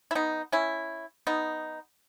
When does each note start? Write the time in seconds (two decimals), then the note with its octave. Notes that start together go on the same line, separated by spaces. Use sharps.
0.11 E4
0.15 B3 D#4
0.52 C#4 E4
1.27 B3 D#4